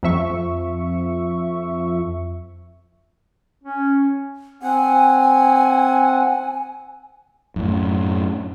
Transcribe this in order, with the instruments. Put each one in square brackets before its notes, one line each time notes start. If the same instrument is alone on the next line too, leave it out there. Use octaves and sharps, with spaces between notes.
[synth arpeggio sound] F2 F3 E5 C#6
[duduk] C#4
[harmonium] C4 F#5 [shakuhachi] G#5
[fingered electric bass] F#2 A2